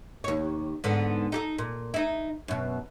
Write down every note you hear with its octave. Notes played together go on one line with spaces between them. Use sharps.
D#2 C#5
G#2 D3 B3
D#4 G4 A4
A#2
D#4 E4
F#2 B2